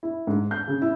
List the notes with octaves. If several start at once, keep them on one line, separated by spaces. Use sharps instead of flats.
E4
G#2
G6
C#3
E4